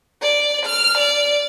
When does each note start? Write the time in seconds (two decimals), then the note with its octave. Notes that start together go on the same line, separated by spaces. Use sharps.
0.22 D5
0.66 F6
0.98 D5